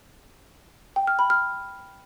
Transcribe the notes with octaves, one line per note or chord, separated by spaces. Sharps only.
G5
F6
B5
F6